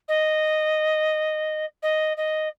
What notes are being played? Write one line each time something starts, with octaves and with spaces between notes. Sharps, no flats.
D#5
D#5
D#5